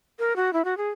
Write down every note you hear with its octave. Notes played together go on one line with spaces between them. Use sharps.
A#4
F#4
E4
F#4
G#4